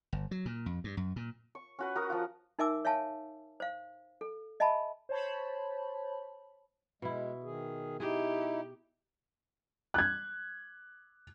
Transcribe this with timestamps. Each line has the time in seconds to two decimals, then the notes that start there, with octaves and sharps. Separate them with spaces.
0.13 G1
0.31 F#3
0.46 A#2
0.66 F2
0.84 G2
0.97 F#2
1.16 A#2
1.55 C#6
1.79 C#4 F#4 B4
1.95 F#4 A#4 D#6
2.10 F3 F4
2.59 D#4 A#4 E5 G#5 D6 E6
2.85 C#5 E5 F5 G#5 A5
3.60 C5 F5
4.21 A4
4.60 D#5 E5 G#5 A5 B5
5.09 C5 C#5 A5 B5
7.02 B2 G#3 E4
7.44 D#3 G#4
8.00 D#4 E4 G4 G#4
9.94 F#6 G#6